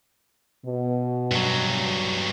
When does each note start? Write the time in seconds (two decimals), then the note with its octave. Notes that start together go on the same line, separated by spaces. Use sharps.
0.65 B2
1.32 G2 F#3